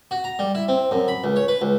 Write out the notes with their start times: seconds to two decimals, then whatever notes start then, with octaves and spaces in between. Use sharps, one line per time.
0.11 F#4
0.24 A#5
0.39 G3
0.55 E4
0.68 C4
0.91 F#2
1.08 B5
1.24 C#2
1.36 C#5
1.48 B4
1.62 C#2